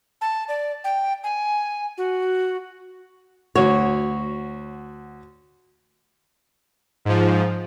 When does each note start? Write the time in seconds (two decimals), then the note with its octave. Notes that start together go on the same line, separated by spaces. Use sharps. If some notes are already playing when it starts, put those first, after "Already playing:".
0.21 A5
0.49 D5
0.84 G5
1.24 G#5
1.98 F#4
3.56 D2 F#4 C#5
7.05 G#2 F3